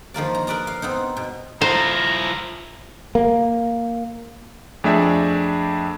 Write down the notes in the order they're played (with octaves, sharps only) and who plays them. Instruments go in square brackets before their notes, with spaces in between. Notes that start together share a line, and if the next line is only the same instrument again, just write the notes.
[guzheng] D#3 F3 A#3 D5
A#5
A#4 B4 D5 D#5 A#5
F5
B3 C4 D#4
B2
[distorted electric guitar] F3 E4 [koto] C5 [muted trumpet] A#5
[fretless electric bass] A#3
[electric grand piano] F2 A3 D4 G#4 E5